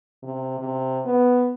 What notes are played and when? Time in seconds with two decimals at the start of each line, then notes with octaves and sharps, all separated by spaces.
0.23 C3
0.59 C3
1.05 B3